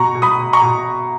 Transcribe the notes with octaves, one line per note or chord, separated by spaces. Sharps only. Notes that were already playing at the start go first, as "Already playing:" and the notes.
Already playing: B2 A#5 C#6
B2
B5 D#6
B2
A#5 C#6
B2